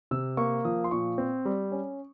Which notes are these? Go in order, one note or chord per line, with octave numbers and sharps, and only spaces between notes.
C3 E6
A#3 C#6
F3 D#6
C6
A#2 C#6
C4
G3
C#4